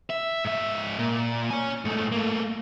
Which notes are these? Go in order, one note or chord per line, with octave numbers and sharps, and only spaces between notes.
E5
G#2 E5
A#2
C#5 G#5
G#2 A3
A3 A#3